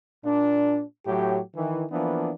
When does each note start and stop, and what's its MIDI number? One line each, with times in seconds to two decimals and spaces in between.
0.25 0.82 46
0.25 0.82 62
1.06 1.39 45
1.06 1.39 54
1.06 1.39 67
1.55 1.84 51
1.55 1.84 52
1.91 2.31 52
1.91 2.31 53
1.91 2.31 58
1.91 2.31 59
1.91 2.31 62